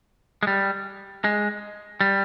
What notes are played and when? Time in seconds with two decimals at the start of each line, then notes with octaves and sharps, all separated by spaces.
0.43 G#3
0.47 G3
1.24 G#3
2.01 G3